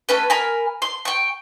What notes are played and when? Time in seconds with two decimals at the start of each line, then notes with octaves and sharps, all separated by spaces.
0.09 A3 C#4 B4
0.30 A#4 G#5 B5
0.82 C6
1.05 G5 C#6